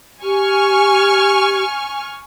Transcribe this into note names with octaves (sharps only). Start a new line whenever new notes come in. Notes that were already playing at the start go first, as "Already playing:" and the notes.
G4 G#5 C#6 F6